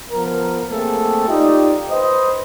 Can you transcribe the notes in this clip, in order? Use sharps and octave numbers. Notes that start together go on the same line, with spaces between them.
F3 B3 A#4
A3 A#3 C4 G#4 A4
D#4 F4 G4 D5 D#5
B4 C5 D#5